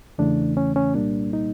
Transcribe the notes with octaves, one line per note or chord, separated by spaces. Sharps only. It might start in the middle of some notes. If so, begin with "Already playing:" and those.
E2 C#3 E3 A3 D4
C#4
C#4
C2 A#2 G3 A#3 D4
D#4